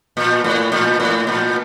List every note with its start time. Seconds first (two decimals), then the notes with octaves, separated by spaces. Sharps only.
0.17 A#2
0.44 A2
0.72 A#2
1.00 A2
1.27 A#2